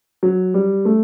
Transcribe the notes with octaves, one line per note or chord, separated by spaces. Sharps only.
F#3
G3
A3